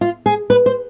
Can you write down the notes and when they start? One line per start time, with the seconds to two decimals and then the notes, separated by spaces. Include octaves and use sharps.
0.01 F4
0.26 G#4
0.50 B4
0.66 C5